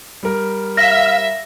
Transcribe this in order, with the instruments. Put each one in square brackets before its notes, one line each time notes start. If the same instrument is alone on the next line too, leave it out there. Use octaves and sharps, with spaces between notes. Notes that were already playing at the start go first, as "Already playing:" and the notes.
[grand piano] G3 A#4
[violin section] E5 [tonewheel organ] F5 [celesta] A#6